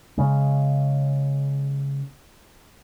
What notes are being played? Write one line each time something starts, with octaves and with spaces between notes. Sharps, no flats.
C#3 G#3